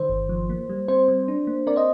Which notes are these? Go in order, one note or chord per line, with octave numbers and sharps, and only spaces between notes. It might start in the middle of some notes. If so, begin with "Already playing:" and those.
Already playing: D#3 C5
G1
F3
A#3
G3
C4 C5
G3
D4
A#3
C4 A#4 D5
C5 D#5